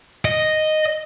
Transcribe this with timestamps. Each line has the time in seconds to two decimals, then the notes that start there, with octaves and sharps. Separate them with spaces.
0.25 D#5